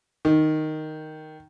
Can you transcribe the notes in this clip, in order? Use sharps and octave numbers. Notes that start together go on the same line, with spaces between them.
D#3